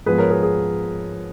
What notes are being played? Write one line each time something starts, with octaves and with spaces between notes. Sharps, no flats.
G#2 F3 B3 G#4 B4
A#4 C#5
G#4 B4
G#4